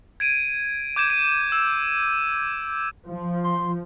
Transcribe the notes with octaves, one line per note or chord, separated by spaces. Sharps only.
G#6 D7 D#7
D6 G6 G#6 E7
D#7
E6
F3
C6